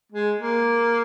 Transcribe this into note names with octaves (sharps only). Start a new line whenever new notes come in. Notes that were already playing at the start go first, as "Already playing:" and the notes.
G#3
A#3